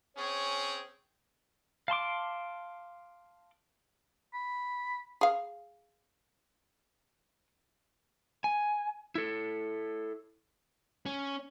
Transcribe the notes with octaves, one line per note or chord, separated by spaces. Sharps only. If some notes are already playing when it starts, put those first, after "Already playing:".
C4 C#4 G#4 C#5
F5 A5 C6 D6
B5
G#4 F5
G#5
E4 A4
C#4